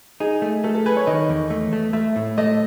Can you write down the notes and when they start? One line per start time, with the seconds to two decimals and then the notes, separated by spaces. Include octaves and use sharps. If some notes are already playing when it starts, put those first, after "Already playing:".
0.20 D#4 G#4
0.42 A3
0.64 A3 A4
0.75 A4
0.86 G#4 B4
0.97 C#5
1.07 D#3 D#5
1.29 E2
1.50 A3
1.73 A3
1.93 A3 E5
2.16 A2
2.38 A3 D#5